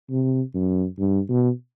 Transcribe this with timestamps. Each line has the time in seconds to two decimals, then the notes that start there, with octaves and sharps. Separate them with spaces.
0.10 C3
0.54 F#2
0.99 G2
1.29 B2